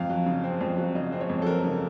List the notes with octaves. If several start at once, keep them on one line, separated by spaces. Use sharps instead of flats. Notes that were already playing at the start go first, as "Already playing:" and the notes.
Already playing: F2 F5
F#3
C#3
C4
F2
F#3
C#3 D#5
C4
C#5
F2
A4
F#3 A#4
C#3